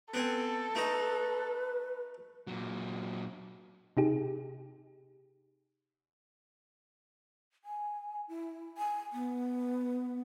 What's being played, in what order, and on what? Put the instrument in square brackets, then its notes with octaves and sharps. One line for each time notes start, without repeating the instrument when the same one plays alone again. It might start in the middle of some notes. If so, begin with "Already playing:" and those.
[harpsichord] B3 C4 G#5 [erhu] A4
[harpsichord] A3 D#4 D#5 [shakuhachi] B4
[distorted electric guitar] A#2 F#3
[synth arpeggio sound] C3 D#4 G4 G#4
[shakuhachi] G#5
E4
G#5
B3